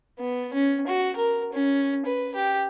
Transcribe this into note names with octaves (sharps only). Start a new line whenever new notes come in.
B3
C#4
F#4
A#4
C#4
B4
G4